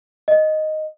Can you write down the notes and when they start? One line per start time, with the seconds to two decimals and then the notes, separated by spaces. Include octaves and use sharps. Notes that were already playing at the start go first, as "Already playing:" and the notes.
0.28 D#5